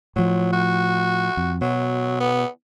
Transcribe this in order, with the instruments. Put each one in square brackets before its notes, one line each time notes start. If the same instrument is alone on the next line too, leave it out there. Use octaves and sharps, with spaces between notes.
[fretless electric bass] A2 F3 [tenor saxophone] F#3
[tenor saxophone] F#4
[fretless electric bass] F2
[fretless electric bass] B2 [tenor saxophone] F#3
[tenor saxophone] B3